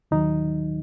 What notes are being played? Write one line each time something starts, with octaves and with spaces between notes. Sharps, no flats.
D#2 D#3 F#3 D#4